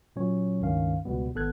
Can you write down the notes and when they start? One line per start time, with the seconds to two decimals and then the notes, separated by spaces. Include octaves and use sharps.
0.16 A#2 F#3 C#4 C#5
0.60 C#2 G2 D#3 C#4 F5
1.05 C#2 B2 G3 B3
1.35 G#1 B3 A4 F#6 G#6